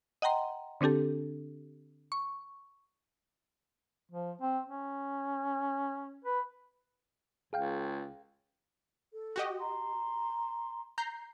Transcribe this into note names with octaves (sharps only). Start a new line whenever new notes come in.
D#5 F#5 G5 A#5 C6
D3 C4 D4 G4 A4
C#6
F3
C4
C#4
B4
C#2 G#4 F5 G5
A4
F#4 G4 D#5
A#5 C6
A#5 G6 C7